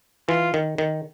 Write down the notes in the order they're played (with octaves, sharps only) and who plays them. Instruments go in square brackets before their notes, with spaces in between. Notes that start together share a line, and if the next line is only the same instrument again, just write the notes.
[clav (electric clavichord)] E3 [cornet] F4
[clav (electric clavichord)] D#3
D#3